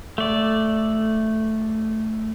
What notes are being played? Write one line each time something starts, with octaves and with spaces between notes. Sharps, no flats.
A3 D5